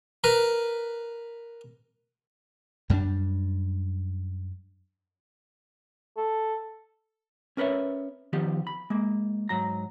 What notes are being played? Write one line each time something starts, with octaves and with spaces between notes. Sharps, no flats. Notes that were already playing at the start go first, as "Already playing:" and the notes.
A#4 B4
F#2 G3 G#3 D4
A4
C#4 A#4 B4 C#5 E5
D#3 F3 B3 G4
B5
G#3 A#3
G#2 F#3 A#5